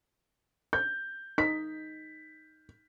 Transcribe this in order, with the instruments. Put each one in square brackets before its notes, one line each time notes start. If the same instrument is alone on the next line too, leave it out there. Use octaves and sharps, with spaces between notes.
[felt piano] G6
[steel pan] D#4 [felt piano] B6